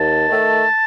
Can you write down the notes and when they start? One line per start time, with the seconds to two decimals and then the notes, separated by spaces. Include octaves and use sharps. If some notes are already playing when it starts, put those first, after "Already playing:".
Already playing: D#2 A5
0.28 D#3 A3